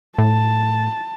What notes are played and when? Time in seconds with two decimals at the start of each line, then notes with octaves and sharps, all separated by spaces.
0.18 A2 A5